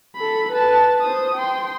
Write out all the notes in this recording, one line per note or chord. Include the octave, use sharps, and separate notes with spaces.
A4 B5
B4 A5
C5 D#6
G5 C6